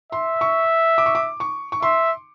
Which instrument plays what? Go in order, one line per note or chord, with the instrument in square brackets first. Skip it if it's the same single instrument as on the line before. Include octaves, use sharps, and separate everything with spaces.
[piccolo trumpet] E5 [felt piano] C6
[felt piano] C#6
D6
C#6
D6
C#6
C#6
[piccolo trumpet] E5 [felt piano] C6